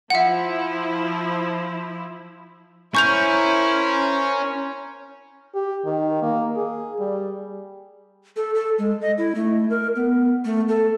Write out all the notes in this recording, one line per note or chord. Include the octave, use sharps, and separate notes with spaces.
F3 E4 E5 F#5
C#4 E4 A#4 C5 C#6 G6 F7
G4
D#3
A#3
G#4
G3
A4
A4
G#3
D#5
E4
A3
A#4
B3
A3
A4